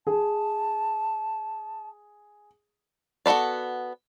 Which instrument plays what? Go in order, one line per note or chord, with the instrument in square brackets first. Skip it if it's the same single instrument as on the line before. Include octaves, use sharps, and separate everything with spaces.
[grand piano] G#4 [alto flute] A5
[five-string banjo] B3 F#4 A4 B4 D5